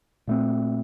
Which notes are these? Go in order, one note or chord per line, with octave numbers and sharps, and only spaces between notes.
A#2 A3 C4